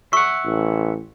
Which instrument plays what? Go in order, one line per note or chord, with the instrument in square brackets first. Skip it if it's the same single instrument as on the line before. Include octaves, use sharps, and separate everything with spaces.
[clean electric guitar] E5 F#5 [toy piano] C#6
[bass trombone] A1